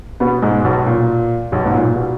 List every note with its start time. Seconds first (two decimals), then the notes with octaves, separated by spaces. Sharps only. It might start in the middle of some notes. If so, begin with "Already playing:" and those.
0.20 B2 B3
0.42 G#2 G#3
0.64 B1 B2
0.86 A#2
1.52 B1 B2
1.65 G#2
1.74 A#2
1.96 B2